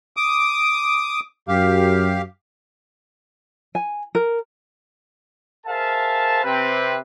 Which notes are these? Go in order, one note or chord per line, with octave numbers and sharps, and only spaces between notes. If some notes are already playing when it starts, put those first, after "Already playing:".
D6 D#6
F#2 G4 F5
G#5
A#4
G#4 A#4 C5 E5 F5 A5
C3 C4 B4